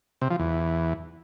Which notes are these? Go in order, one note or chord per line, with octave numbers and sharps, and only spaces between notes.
C3
F3
E2